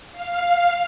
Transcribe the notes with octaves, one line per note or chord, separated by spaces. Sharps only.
F5